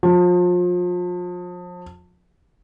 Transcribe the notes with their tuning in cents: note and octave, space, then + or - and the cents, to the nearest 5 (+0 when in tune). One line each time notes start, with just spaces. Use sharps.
F3 +35